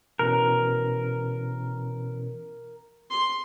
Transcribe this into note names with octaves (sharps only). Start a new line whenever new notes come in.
B2 E3 C#4 A#4
C6